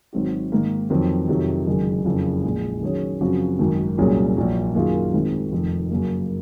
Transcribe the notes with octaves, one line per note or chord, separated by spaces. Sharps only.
G#1 G#2 F#3 C4 F#4
G#2 D#3 A#3
F2 D#3 F#3 C4
F2 C3 D#3 F#3
F#1 F#2 D#3 G#3
F#1 F2 C#3 F3
A#1 A#2 G#3
D#3 F#3 C#4 G#4 C#5
F#2 C#3 F3 C4 F#4
G#1 F#2 D#3
C2 A#2 F#3 C#4 G#4
A#1 A#2 F#3
F#2 D#3 A#3 F4 G#4
G#1 G#2 D#3 G#3 C4
F1 F2 D#3
F#2 C#3 F#3 A#3